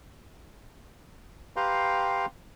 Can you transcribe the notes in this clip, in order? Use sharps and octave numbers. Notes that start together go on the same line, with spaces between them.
G4 B4 F5 G5 A#5 C6